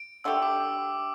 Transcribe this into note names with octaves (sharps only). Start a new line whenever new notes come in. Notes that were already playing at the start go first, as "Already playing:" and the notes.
Already playing: D7
D3 A3 G4 E6
D6